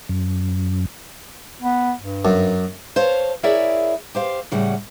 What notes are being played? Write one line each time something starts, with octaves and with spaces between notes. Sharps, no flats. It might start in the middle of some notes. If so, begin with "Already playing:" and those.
F#2
B3
G2
F#2
C5 C#5 F5 A5
E4 G#4 A#4 C#5 D5 E5
G4 C5 F5
A2 C#3 G3 F#5